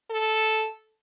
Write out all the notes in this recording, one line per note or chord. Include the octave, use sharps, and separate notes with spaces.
A4